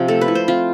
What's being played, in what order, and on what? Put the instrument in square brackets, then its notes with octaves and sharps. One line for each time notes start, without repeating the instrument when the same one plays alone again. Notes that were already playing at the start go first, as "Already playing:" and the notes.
Already playing: [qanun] C3 F3
A3 A4
B4
E4
C5
C4 F4